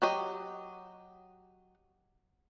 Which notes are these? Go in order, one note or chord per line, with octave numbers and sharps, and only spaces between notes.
F#3 G4 D#5